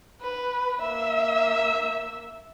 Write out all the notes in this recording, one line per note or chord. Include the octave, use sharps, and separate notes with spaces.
B4
A#3 E5